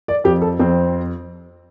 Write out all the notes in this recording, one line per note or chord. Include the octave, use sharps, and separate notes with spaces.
D5
F2 G4
A4
F2 C4